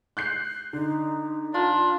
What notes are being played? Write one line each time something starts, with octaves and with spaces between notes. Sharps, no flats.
F#6 G6 C7
D3 D#4
D4 F4 A5